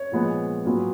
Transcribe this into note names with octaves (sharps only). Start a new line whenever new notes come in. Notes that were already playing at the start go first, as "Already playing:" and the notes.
Already playing: C#5
A#2 F3 G#3 B3
A#2 F#3 B3